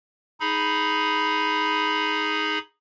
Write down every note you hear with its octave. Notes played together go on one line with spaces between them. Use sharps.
D#4 G#4 B5